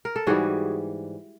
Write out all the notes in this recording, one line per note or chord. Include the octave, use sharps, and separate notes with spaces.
A#4
A4
G#2 E3 G3 F#4 G#4